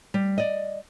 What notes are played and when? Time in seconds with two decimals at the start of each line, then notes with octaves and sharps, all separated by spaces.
0.14 G3
0.38 D5 D#5